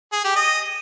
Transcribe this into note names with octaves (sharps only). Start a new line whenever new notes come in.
G#4
G4
D#5